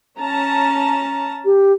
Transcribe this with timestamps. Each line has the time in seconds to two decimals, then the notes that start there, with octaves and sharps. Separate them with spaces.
0.20 C#4 A5 A#5
1.45 G4